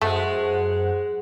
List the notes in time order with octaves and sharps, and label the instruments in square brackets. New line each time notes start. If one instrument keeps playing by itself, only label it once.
[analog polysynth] F#2 C5 F#5 [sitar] G#3 [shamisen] A3